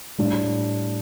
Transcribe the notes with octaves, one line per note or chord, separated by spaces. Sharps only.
A2 G3 D4